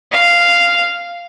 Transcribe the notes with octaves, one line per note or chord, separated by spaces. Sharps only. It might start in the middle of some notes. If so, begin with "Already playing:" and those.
F5